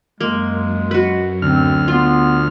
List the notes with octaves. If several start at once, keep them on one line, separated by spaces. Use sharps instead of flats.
F#2 G#3 A#3
F#4 B4
D2 C4 F6
B3 F4